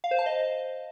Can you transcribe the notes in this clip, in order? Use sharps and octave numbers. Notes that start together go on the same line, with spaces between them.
F5
C5
A5
D#5